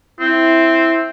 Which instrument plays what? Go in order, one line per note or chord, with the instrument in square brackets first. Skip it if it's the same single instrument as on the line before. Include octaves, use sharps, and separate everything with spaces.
[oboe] C4 [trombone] E4